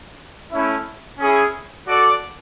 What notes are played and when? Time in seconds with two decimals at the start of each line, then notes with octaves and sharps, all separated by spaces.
0.51 A3 C#4 E4
1.18 C#4 E4 G#4 C#5
1.86 F#4 A4 D5